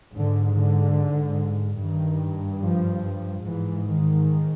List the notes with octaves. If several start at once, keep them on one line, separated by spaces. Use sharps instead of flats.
G#2 D3
D3
G2 D#3
F3
G#2 E3
D#3